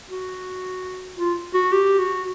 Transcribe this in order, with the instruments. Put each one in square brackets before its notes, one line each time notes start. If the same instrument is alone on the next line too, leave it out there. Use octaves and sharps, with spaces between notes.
[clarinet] F#4
F4
F#4
G4
F#4